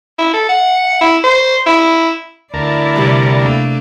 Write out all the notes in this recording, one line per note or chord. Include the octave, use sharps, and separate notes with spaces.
E4
A4
F#5
E4
C5
E4
D2 E4 A#4 D5 A5
C3 G3
A3 A#3 D4